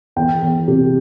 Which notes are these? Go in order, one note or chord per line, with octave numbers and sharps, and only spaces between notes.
E2 G5
E2
C3